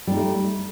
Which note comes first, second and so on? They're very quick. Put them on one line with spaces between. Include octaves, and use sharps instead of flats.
G3 D#4 A3